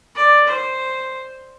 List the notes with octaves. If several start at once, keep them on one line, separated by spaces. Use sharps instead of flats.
D5
C5